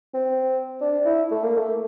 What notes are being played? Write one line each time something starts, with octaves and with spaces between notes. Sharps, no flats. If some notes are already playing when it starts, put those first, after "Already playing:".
C4
D4
E4
A3
A#3
A3